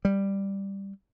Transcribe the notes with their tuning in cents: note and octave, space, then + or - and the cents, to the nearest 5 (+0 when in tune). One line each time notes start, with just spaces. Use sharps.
G3 +5